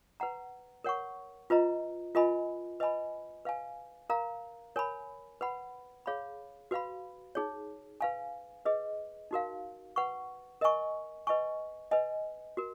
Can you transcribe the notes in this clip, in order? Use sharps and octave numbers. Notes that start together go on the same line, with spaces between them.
B4 F#5 A#5
A#4 C#5 F#5 C#6
F4 B4 D#5 A#5
F4 A#4 D#5 G#5 B5
B4 D#5 G#5 B5
B4 F5 G#5
A#4 F5 A#5
A#4 C#5 G#5 B5
B4 F#5 B5
G#4 C#5 F5 B5
F#4 B4 F5 B5
D#4 G#4 C#5
B4 F5 G#5
G#4 B4 D#5
D#4 F#4 A#4 F5
B4 F#5 C#6
A#4 D#5 G#5 C#6
B4 D#5 G#5 C#6
B4 D#5 G#5
F#4 A#4